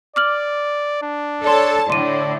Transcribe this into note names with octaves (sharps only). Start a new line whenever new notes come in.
D5 D6 F6 F#7
D4
A4 C#5 D5 A5 C6
A2 D3 D5 C6 D#7